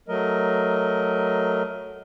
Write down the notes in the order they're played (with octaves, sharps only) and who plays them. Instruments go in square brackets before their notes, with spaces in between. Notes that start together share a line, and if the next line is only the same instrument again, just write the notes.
[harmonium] F#3 A3 A#4 D#5